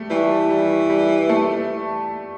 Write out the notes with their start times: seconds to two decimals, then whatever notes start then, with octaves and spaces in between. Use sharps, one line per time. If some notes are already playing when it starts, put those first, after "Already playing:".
Already playing: G3 A3
0.10 E3 G3
0.50 G3
0.90 G3
1.29 A3